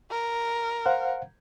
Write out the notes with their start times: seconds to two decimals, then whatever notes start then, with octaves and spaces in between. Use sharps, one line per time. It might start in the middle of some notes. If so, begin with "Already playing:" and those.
0.11 A#4
0.86 C5 F5 F#5